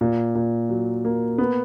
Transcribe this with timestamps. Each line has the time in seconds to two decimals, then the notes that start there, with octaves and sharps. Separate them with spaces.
0.01 A#2
0.35 A#2
0.69 F#3
1.05 A#3
1.38 B3